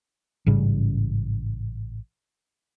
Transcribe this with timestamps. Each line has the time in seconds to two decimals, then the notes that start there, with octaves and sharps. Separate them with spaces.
0.46 A1 G#2 C#3 G3